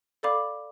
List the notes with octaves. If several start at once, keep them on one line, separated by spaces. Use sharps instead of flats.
A4 D5 F5 B5 D6